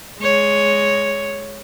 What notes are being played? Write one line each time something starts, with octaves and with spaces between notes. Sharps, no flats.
G#3 C#5